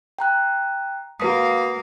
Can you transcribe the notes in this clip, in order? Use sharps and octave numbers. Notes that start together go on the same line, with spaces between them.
G5 A#5 F#6
A#3 F#4 B4 F5 D#6